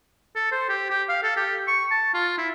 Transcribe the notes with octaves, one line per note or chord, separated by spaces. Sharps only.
A4
C5
G4
G4
F5
A4
G4
C#6
A5
F4
E4